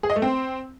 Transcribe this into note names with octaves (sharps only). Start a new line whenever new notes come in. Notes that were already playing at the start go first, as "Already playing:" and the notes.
G#4
D#5
A3
C4